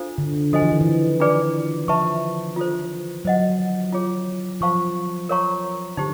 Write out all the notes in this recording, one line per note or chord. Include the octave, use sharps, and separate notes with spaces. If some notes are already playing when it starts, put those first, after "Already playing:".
Already playing: D4 F4 A4 C5 F5
D3
F3 F#4 A4 C5 D#5 G#5
E3
D#3
E3
D4 F4 G#4 B4 D5
F3 B4 E5 A5 C#6
F4 A4 C5
F#3 C5 D#5 F#5
F4 G#4 C#5
F3 C5 F5 A5 C#6
A#4 C#5 F5 A#5 C#6
D3 D#4 G4 C5